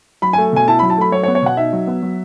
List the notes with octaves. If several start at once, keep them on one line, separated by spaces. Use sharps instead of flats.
F#3 B5
G#5
A3
B2 G#5
E4 A5
B5
F#3
A5
A3 B5
F#3 C#5
C#5
B3
C#5
B2 F#5
D#4 E5
F#3
B3
F#3